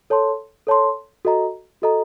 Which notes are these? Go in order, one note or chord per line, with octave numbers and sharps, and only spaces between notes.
A4 C#5 A5 C6
A4 C#5 A5 C6
F#4 A4 D#5 A#5
F#4 A4 D#5 A#5